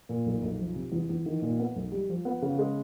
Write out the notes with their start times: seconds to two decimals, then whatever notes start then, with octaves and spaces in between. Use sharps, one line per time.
0.09 A#2
0.26 B1
0.43 B1
0.59 F3
0.76 C3
0.92 E2
1.09 E2
1.26 D#3
1.42 A#2
1.59 B3
1.76 B1
1.92 G3
2.09 F3
2.25 B3
2.42 C#3
2.59 G#3